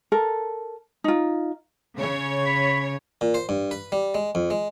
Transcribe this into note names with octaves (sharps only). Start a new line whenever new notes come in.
A4 A#4
D#4 F4
C#3 C#5
B5
A#2
C5
G2
B4
G3
G#3
F2
G#3